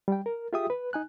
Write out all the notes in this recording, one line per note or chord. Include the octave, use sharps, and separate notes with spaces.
G3 G5
A#4
F4 G4 G#4 E5 G5 D#6
B4
D#4 G#5 F#6